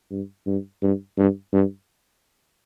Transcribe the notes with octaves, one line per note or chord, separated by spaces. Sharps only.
G2
G2
G2
G2
G2